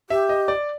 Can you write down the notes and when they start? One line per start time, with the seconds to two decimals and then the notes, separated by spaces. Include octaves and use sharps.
0.10 G4 E5
0.29 D#5
0.48 D5